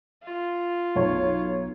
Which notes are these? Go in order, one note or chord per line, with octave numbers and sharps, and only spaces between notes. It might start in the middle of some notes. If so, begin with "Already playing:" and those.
F4
B1 C#5